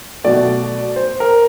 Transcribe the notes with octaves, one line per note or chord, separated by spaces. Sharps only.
B2 F#3 A3 D5
C5
A#4